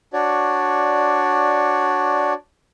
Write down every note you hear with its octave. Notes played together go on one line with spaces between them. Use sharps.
D4 F#4 C#5 D5